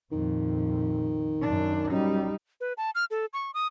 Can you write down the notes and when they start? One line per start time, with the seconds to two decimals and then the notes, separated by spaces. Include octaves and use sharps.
0.12 A#1 F2 D#3
1.42 F#2 D4
1.91 F#2 G3 D#4
2.61 B4
2.77 A5
2.95 F6
3.11 A4
3.33 C#6
3.54 D#6